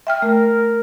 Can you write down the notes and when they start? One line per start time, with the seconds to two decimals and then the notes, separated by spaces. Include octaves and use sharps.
0.07 E5 G5 F6
0.22 A3 A#4